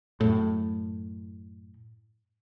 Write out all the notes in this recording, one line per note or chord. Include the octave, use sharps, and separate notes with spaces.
F#2 A2